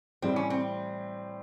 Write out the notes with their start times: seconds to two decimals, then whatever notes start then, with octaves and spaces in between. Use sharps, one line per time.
0.22 A2 E3 G3 C4
0.36 C#4
0.50 C4